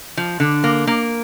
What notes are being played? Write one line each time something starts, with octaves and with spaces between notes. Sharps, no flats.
F3
D3
A#3
A#3